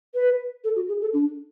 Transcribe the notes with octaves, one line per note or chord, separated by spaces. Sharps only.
B4
A4
F#4
G#4
A4
D4